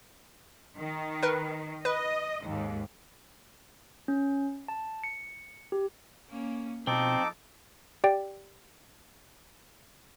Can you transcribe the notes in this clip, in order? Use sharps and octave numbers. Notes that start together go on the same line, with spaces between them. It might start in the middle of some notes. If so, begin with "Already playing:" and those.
D#3
A#4 B4
B4 D#5
D#2 G#2
C#4
A5
C#7
G4
A#3 C#4
B2 F3 C4 D#4 A4 D6
G4 D5 G5